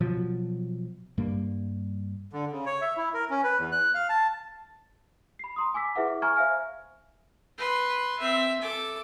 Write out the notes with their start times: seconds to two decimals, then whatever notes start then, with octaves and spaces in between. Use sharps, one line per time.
0.01 B2 F3 F#3
1.18 G2 G3 A#3
2.33 D3
2.52 C#3
2.66 C#5
2.82 E5
2.97 E4
3.14 A#4
3.30 C#4
3.44 B4
3.58 E2
3.72 F#6
3.95 F5
4.09 A5
5.39 B5 C7
5.56 A#5 C6 D#6
5.74 G#5 D6 E6 B6
5.95 E4 G#4 B4 E5 F#5 D6
6.22 G#5 A#5 C#6 F6 G#6
6.36 C5 E5 F5 G#5 F6
7.58 B4 C6
8.19 C4 E5
8.61 A4 D6